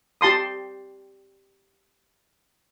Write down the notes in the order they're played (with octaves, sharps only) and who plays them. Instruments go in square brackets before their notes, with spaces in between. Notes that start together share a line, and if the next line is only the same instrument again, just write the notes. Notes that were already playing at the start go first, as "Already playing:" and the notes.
[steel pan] G4 A5 C6 D#6